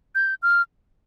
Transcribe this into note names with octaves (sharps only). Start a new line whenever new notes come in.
G6
F6